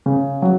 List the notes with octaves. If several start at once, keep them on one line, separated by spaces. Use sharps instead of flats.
C#3
F#3